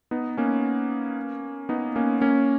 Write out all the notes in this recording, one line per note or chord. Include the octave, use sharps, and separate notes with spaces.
B3 D#4
A#3 C#4
B3 D#4
A#3 C#4
A#3 C#4